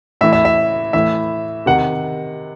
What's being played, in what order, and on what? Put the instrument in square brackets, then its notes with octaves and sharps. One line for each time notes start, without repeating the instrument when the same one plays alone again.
[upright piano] A2 E3 E5
E5
E5
A2 E3 E5
C3 D#3 F#5